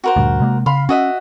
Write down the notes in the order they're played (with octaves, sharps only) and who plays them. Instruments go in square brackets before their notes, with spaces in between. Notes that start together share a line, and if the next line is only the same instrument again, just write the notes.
[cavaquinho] F#4 A#4 C5
[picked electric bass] D2 G2 A#2
C3 G#3 A#3
[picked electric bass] C#3 [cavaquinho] F5 B5 C6
[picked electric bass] C#4 [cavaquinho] F#4 D#5 E5